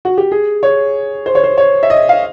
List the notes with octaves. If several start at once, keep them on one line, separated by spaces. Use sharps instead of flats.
F#4
G4
G#4
C#5
C5
C#5
C5
C#5
E5
D#5
F5